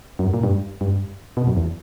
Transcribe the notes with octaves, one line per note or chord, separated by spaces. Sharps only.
F#2
G2
A#2
G2
G2
B2
F#2
E2